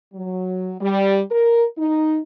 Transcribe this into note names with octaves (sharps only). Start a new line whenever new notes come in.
F#3
G3
A#4
D#4